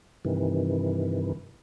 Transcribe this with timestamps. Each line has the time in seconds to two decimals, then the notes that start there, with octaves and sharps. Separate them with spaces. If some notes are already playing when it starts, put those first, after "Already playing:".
0.25 G2 C3 D#3 E3